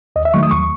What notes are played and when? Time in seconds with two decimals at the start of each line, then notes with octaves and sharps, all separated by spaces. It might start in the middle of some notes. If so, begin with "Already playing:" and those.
0.16 D#2 D#5
0.25 E5
0.34 D#3 F#3 A3 C#6
0.43 D#6
0.51 D#2 C#6